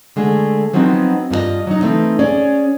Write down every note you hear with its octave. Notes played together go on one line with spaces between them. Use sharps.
D3 G#3 A3 G#4
F3 F#3 B3 C4 D#4
G2 F4 G#4 D#5
F#3 D#4
E3 A3 C4 D#4
C#4 G#4 C#5 D5